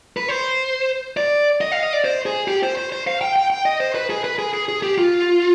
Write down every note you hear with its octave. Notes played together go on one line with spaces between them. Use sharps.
B4
C5
D5
D#5
F5
D#5
D5
C5
G#4
G4
C5
C5
C5
F5
G5
G5
G5
D#5
C5
B4
G#4
B4
G#4
G#4
G#4
G4
F4